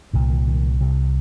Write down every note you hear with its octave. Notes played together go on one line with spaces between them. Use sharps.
C2 A#2 D#3
D#3
D#3
C2 C3